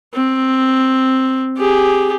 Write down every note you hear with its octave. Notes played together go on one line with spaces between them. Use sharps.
C4
G4 G#4